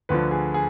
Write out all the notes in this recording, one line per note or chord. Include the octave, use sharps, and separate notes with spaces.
D2 D3 F3 B4
G#4
G#4